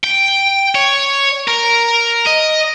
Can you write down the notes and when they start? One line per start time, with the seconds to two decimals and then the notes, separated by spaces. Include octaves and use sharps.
0.04 G5
0.75 C#5
1.48 A#4
2.27 D#5